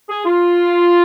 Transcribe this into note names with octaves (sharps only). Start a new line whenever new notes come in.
G#4
F4